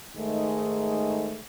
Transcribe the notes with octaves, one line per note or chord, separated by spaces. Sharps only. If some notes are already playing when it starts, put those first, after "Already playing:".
G#2 D#3 G#3 A3